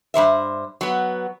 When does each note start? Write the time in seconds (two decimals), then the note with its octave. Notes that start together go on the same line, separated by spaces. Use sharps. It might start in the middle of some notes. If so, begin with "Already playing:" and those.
0.14 G2 E3 C5 E5
0.81 F#3 B3